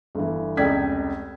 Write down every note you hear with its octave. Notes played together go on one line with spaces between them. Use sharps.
G1 E3
F1 C#2 D5 G5 G#6 B6